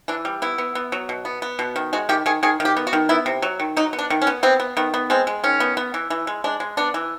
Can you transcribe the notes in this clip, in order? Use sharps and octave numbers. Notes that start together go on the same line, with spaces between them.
E3 D4
G3
B3 E4
B3
B3
F#3
B2
B3
B3
B2
D#3
G#3 F#4
D#3 G4
D#3 G#4
D#3 G#4
D#3
G4
B3
F#4
D#3
B3 E4
C3
F#3
D#3
F#3 D#4
B3
D4
D#3
C#4
B3
B3 C4
B3
D#3 B3
B3
G#3 C4
G#3
D#3 C#4
B3
B3
E3
E3
G#3
G#3 D4
G#3
B3 D4
E3